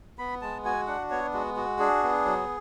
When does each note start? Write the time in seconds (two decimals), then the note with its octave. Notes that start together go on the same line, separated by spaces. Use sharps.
0.18 B3 B5
0.42 G#3 A5
0.65 F#4 G#5
0.87 D4 F#5
1.11 B3 C#5
1.33 G#3 F#4
1.57 F#4
1.79 D4 G#4
2.03 B3
2.25 F#3